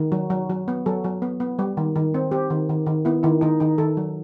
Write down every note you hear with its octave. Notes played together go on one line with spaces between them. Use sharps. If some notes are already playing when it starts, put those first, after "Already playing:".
Already playing: D#3
F#3
F#3
F#3
B3
F#3 A4
F#3
B3
B3
G3
D#3
D#3
C4
C4 G4
D#3
D#3
D#3
B3 E4
D#3 E4
D#3 D#4
D#3 D#4
D#3 A4
F#3